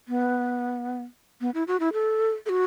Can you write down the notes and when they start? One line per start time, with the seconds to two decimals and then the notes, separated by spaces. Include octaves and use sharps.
0.08 B3
1.41 B3
1.54 E4
1.67 F#4
1.80 E4
1.93 A4
2.46 A4
2.49 F#4